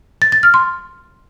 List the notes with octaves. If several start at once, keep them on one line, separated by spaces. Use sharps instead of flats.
A6
A6
F6
C6